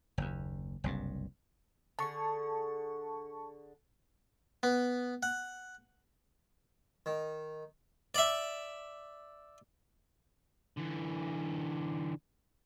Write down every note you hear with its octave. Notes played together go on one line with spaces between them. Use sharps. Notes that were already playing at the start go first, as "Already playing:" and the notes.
F#1 D#2
F#1 C2 G2
D3 G#4 A5 C#6
B3
F#5
D#3
D5 E5
D3 E3